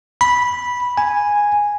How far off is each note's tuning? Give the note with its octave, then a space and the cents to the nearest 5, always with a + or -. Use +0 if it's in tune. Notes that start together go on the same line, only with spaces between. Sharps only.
B5 -10
G#5 -5